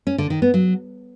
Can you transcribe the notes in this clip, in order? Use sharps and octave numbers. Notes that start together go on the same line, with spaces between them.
C#4
D3
D#3
B3
F#3